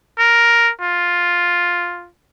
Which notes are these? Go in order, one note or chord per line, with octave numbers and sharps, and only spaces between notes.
A#4
F4